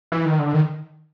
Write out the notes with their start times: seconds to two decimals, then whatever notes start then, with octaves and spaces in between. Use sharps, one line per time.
0.12 E3
0.25 D#3
0.39 D3
0.54 D#3